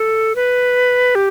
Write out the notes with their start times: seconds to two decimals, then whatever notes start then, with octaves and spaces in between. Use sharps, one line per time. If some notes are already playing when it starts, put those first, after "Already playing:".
Already playing: A4
0.36 B4
1.15 G4